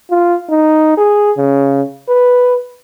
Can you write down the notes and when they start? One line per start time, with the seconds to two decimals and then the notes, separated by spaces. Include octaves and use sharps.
0.11 F4
0.50 D#4
0.97 G#4
1.38 C#3
2.09 B4